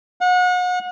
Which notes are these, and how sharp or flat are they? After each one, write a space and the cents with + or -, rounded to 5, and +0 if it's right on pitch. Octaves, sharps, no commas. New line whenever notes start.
F#5 -35